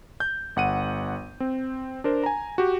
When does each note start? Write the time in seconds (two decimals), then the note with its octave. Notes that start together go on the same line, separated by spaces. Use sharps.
0.20 G6
0.56 G1 F#5 D#7
1.40 C4
2.04 D4 A#4 C5
2.24 G#5 A#5
2.58 F#4 G4